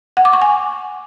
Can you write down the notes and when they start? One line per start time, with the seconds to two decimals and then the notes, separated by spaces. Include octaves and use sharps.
0.17 F#5
0.25 D6
0.33 C#6
0.42 G#5